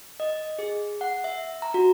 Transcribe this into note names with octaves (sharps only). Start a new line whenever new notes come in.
D#5
G#4
F#5
E5
A#5
F#4